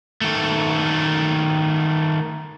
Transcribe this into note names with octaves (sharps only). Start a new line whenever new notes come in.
D#3 A3